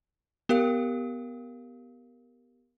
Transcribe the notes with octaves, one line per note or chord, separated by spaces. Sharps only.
B3 G4 A#4 F5